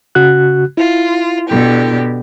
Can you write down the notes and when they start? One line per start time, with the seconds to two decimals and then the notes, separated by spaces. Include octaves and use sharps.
0.15 C#3 F#4 F#6
0.77 E4 F4
1.49 B2 D3 G4